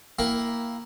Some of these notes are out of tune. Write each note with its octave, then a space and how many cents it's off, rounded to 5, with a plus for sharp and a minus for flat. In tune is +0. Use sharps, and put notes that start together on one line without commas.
A#3 +0 E4 +0 G5 +0